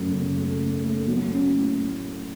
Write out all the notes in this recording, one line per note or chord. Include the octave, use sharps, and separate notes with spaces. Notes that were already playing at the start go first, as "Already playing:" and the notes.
Already playing: F#2 C#3 A3
C#3
A3
A3
A3
F#3
C#4
A2